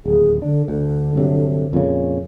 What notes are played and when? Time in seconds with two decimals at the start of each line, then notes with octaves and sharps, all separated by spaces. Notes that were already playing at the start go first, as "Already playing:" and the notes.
0.05 D1 D#2 G#4
0.42 D3 D4
0.68 D2 D3
1.15 G2 C3 F#3
1.73 F2 A#2 C#3